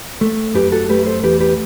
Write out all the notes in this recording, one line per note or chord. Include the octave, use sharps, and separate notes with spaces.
A3
F#2 G4 B4
F#4 A4
A3 G4 B4
A4 C5
E2 G4 B4
G4 B4